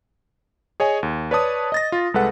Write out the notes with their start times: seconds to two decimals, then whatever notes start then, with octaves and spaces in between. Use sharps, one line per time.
0.80 G#4 C#5 D#5 G#5
1.03 D#2
1.31 B4 C#5 D5 A5 D#6
1.72 D#5 A6 A#6
1.92 F4
2.14 C2 G#3 A4 B4 F#5